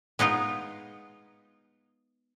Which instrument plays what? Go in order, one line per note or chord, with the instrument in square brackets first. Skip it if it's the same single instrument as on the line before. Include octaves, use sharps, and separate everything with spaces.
[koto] G#3 B3 D#4 F4